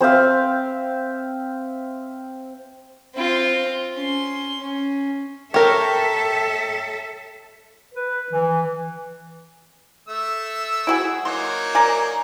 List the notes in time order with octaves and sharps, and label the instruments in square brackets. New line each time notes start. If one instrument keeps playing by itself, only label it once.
[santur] C4 C5 E5 F5
[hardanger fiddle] C4 F4
C#4 C6
C#4
[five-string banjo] G4 A#4 [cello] A4 E5 [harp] C#5 G5 A#5
[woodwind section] B4
E3
[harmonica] A3 E6
[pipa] E4 F#4 G#4
[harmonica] F#3 A#3 D#4 [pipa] C6
[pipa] A#4 D5 G#5